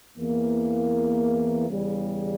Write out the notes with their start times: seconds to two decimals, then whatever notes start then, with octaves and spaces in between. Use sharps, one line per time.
0.17 E2 E3 A#3
1.70 E2 C#3 G3